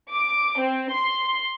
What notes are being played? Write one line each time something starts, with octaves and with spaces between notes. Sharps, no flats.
D6
C4
C6